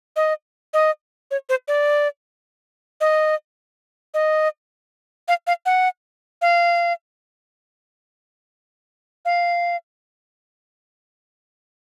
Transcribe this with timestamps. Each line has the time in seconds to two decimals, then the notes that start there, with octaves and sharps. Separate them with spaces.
0.16 D#5
0.74 D#5
1.31 C#5
1.49 C5
1.68 D5
3.01 D#5
4.14 D#5
5.28 F5
5.47 F5
5.66 F#5
6.42 F5
9.25 F5